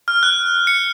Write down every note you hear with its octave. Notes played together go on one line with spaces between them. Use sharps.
F6
F#6
C#7